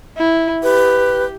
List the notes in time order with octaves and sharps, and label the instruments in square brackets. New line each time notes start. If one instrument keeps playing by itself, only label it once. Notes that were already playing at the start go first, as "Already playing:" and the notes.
[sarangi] E4
[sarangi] G4 [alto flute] B4